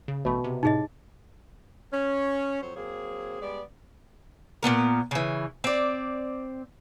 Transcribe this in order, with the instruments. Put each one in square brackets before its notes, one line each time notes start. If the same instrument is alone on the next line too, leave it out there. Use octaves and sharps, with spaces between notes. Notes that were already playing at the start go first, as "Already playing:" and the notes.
[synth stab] C#3
[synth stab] A1 A3 [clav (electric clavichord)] B2
[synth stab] C3
[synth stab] A2 C3 [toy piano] D#4 G#4 D#5
[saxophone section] C#4
F2 F#3 C5 C#5
F#3 A#3 C4 G#4
G3 G#3 B3 D5
[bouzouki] A#2 D3 B3 A#4
C#3 E3
C4 D5